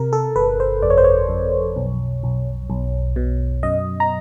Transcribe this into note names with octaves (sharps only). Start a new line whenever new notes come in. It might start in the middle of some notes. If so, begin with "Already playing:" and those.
Already playing: C3 A#4
A4
G1 B4
C5
F2 D5
C#5
C5
C#5
F2
B1
B1
B1
B2
F#2 D#5
A#5